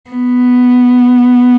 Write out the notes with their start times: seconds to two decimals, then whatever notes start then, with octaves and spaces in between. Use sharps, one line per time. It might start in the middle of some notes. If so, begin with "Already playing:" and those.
0.10 B3